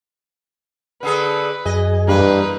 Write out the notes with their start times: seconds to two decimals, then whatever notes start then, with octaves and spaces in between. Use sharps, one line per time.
1.03 D3 G#4 A4 B4
1.65 F#2 G#4 D#5
2.08 E2 G2 A#3 B4